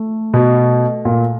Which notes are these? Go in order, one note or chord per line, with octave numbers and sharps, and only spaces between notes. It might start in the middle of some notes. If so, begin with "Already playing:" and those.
Already playing: A3
B2
A#2